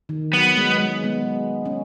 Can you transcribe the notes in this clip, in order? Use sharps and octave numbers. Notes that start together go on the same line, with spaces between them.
D#3
F#3 B3
G#3
G#3
G#3 B3
C#4